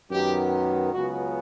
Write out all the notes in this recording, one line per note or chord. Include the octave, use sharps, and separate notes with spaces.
F#2 D#3 F#3 B3 G4
C#2 C#3 F#3 B3 F#4